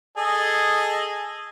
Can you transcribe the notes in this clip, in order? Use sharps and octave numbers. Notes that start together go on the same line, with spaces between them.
G#4 A4 D#5